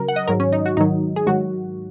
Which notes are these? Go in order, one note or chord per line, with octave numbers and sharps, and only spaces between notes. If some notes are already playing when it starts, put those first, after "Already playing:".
Already playing: C#3 F#3 A#4
F#5
D#5
G#2 D#3 F#3 A#4
C#4
D#4
F#4
G#2 D#3 F#3 D#4
G#4
G#2 D#3 F#3 F#4